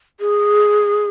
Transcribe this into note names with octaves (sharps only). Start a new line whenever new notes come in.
G#4